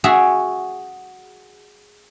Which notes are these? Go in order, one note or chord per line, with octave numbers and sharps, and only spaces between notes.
F#4 G#4 E5